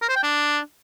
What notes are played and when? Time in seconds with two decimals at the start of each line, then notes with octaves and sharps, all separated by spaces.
0.02 A#4
0.09 C5
0.16 G5
0.23 D4